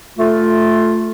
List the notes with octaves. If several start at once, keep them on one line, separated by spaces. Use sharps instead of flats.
A3 F4